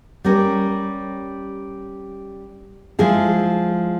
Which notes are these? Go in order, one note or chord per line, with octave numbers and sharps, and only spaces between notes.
G3 C#4 G4 A#4
F3 G#3 E4 G#4